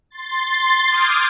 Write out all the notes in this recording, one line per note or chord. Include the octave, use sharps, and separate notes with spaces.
C6 A6
D6 D#6 F6 G6 G#6